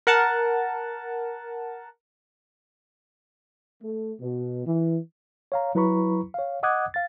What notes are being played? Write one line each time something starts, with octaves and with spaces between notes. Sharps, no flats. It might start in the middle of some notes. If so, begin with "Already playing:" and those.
A#4 F#5 A5
A3
B2
E3
C#5 F5 A#5
F#3 E4 B4 A#5 B5 C#6
C#5 F5
D#5 F#5 D6 D#6 F#6 G#6
F5 A6